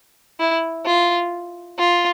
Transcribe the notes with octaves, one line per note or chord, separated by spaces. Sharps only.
E4
F4
F4